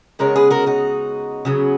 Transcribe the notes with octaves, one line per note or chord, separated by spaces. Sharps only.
C#3 G#3 B3 A#4 C#5
G#4 B4
F#4 A#4
D#4 F#4
C#3 F#3 B3